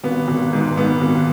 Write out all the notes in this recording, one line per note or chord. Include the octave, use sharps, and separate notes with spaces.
G#1 B3
G#1
G#2
G#2 B3
G#1